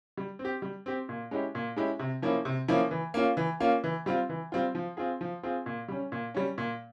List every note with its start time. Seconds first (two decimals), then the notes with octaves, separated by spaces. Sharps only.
0.17 G3
0.39 C4
0.45 G4
0.62 G3
0.86 C4 G4
1.09 A#2
1.31 G#3 C#4 E4 G4
1.55 A#2
1.76 G#3 C#4 E4 G4
1.99 C3
2.22 F3 A#3 C#4 E4
2.45 C3
2.68 F3 A#3 C#4 E4
2.91 E3
3.14 A#3 C#4 F4
3.37 E3
3.60 A#3 C#4 F4
3.84 E3
4.06 G3 C4 F4
4.29 E3
4.52 G3 C4 F4
4.75 F3
4.97 C4 F4 G#4
5.21 F3
5.43 C4 F4 G#4
5.66 A#2
5.88 G3 C#4
6.12 A#2
6.34 G3 C#4
6.58 A#2